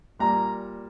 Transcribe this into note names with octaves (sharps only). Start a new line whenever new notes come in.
A#2 G3 A#5